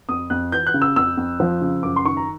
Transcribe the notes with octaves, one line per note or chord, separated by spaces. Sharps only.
F2 D#6
F2 F#6
E3 G6
F#6
C#3
E6
F2 E6
F2
F3
C#3
F#2 D6
C6
D#3 C#6
A#5